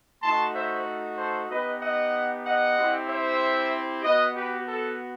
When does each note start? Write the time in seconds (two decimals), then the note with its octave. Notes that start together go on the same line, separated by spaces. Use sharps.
0.22 A3 D#4 F#4 A5 C6
0.54 C5 E5
1.18 A4 C5
1.49 B3 D#4 G4 B4 D#5
1.81 D#5 F#5
2.45 D#5 F#5
2.76 C4 E4 G4
3.07 C5 E5
4.03 B3 F#4 B4 D#5
4.35 G4 B4
4.67 A4